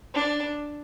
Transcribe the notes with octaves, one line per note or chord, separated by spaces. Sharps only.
D4